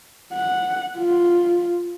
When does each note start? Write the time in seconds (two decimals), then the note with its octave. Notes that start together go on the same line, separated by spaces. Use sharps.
0.34 F#5
0.98 F4